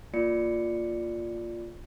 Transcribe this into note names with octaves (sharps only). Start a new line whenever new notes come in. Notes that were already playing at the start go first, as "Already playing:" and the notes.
A#3 F4 D5 C#7